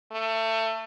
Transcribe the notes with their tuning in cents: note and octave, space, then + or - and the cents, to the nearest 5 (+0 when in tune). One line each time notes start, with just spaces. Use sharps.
A3 +25